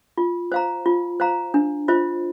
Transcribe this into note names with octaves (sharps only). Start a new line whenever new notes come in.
F4
C5 F5 A#5
F4
C5 F5 A#5
D4
F4 C5 D#5